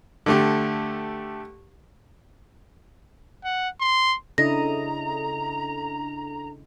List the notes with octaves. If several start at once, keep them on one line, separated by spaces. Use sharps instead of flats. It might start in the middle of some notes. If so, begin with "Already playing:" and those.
D3 A3 G4
F#5
C6
C#3 D4 E4 A4 D#5 A#5 A#6